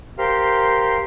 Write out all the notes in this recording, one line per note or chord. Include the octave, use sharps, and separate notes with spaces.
G4 A#4 C5 F5